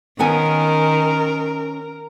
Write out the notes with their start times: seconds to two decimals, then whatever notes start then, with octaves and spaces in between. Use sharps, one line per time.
0.19 D#3 B3 C#4 A#4 G#5